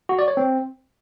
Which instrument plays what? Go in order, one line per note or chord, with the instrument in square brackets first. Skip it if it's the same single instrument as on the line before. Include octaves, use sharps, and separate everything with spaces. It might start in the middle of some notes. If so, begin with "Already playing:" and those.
[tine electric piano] F#4
D5
C#5
C4